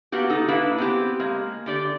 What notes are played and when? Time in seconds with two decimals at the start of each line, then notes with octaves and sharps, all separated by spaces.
0.12 A#3 B3 F#4 G4
0.30 D#4 A4
0.48 A#3 D4 E4 B4
0.78 B3 C4 G4
1.20 G#3 A#3
1.66 D3 G4 D5